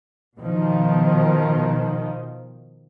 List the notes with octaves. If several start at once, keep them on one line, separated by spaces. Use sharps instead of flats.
B2 D#3 F3